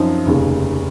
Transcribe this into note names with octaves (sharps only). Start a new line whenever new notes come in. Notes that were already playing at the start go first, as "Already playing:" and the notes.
Already playing: F#2 F3 C4 D#4
F1 D#2 C#3